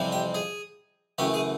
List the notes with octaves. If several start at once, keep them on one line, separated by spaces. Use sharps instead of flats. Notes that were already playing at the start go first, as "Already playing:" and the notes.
Already playing: F2 C3 E3 G3
G4
G#4
F#2 C#3 E3 A3 G4
G#4